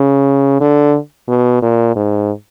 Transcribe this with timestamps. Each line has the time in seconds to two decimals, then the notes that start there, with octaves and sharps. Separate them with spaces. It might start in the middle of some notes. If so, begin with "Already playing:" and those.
Already playing: C#3
0.61 D3
1.29 B2
1.62 A#2
1.96 G#2